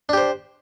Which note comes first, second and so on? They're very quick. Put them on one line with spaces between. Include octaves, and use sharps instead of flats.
D4 G4 C5